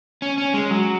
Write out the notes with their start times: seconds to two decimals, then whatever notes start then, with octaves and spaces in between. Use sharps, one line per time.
0.22 C#4
0.38 C#4
0.54 G#3
0.70 F#3